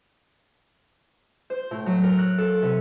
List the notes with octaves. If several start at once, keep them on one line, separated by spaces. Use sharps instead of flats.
C5
A2
F#3
A#4
F#6
A4
C3